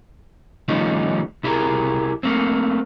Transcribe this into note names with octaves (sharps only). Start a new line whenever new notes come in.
D#3 F3 G3 A3 C#4 D#4
C2 E4 G4 G#4 A#4
A3 A#3 C4